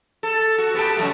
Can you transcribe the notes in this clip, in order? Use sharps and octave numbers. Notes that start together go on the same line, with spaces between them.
A4
F#4
B3 G4 A4
C#3 F#3 A3